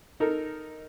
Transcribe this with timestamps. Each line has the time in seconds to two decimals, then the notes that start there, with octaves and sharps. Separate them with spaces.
0.20 D#4 A4 A#4